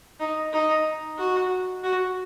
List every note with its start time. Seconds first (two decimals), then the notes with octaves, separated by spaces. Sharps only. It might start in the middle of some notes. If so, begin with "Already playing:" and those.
0.20 D#4
0.52 D#4
1.18 F#4
1.83 F#4